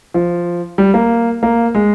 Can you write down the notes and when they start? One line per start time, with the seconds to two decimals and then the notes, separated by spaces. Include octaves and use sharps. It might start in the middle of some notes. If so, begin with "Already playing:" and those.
0.14 F3
0.78 G3
0.94 A#3
1.43 A#3
1.75 G#3